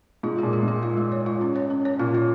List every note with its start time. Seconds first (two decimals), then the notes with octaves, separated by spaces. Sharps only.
0.23 G#2 F4
0.39 A#2 G#4
0.53 G#4
0.63 G#2
0.68 G#4
0.83 F4
0.97 G#3
1.12 C#5
1.26 F4
1.41 C#4
1.56 C#5
1.70 C#4
1.85 C#5
1.99 A#2 F4
2.15 F4